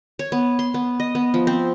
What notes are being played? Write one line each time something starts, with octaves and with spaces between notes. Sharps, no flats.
C#5
B3
C6
B3
D#5
B3
F3
C4